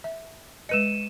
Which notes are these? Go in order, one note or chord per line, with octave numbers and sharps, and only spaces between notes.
E5
G#3 B4 D#5 C#7 D#7 E7